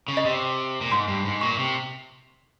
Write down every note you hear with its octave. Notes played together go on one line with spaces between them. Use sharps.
C#3
D#5
C3
A#2
G#2 C6
G2
G#2
A#2 C#6
C3